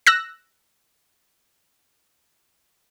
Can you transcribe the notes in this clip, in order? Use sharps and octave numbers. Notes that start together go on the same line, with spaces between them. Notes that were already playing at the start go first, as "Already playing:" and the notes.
E6 F#6 A#6